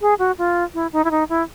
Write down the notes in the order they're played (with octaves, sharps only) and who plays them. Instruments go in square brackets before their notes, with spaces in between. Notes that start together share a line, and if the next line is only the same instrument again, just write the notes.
[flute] G#4
F#4
F4
E4
D#4
E4
D#4
E4